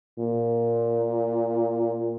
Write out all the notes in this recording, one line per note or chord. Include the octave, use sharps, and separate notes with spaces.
A#2